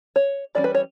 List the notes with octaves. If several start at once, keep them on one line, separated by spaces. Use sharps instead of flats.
C#5
E3 G3 C#4 D5
B4
C#5